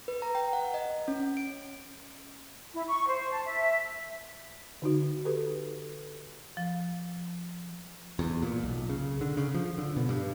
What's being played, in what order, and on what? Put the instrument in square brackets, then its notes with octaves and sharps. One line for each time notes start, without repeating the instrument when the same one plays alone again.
[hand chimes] B4
A#5
G5
F#5
D#5
C#4
D7
[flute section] E4
C#6
C5
A5
E5
[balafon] D3 D#4 F#4
G4 A4 B4
[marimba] F3
[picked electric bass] E2
A#2
B1
C#3
D3
C#3
F3
D3
B2
G2